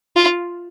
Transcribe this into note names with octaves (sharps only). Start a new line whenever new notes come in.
F4